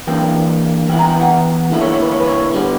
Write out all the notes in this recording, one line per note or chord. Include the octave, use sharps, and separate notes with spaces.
E3 A#3 D4 G5
E3 B3 E4 G5
A#5
G5
F#5
D3 A#3 E4
C#5
C#5
B4
C#5
B4
C#5
D3 G3 B3